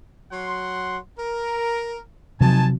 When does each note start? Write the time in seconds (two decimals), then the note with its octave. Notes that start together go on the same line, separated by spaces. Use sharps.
0.32 F#3 F#5 C6
1.19 A#4
2.41 C3 D#3 F3 F#3 G#5 A5